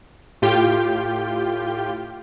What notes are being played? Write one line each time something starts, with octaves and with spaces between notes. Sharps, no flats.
A2 F4 G4 G5 G6